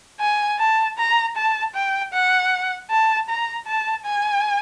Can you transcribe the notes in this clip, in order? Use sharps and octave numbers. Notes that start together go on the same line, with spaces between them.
G#5
A5
A#5
A5
G5
F#5
A5
A#5
A5
G#5